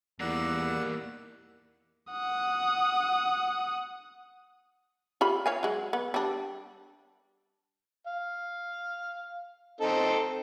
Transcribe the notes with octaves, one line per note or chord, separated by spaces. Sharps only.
E2 G3 A#3 D5 F#5 E6
F#5 D#6
F4 G4 B5
C#5 F5 G#5
F#3 G#3
B3
G3 D4
F5
C4 D#4 A4